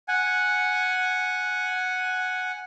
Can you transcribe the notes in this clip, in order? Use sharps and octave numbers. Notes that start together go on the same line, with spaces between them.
F#5 G#5